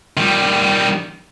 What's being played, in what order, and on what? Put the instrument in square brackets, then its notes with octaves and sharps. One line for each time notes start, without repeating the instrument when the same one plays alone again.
[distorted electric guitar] D#3 G3